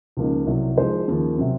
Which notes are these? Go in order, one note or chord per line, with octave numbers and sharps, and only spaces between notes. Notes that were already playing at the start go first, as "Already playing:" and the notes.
C#2 C#3 F3 A#3 D#4
C2 C3 F#3
F3 G#3 D#4 G#4 C5
D#2 C#3 F3 A#3
C3 F#3 C4